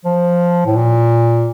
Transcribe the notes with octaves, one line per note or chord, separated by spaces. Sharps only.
F3
A2
A#2